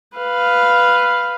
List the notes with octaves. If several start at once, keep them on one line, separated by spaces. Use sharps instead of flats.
B4 F5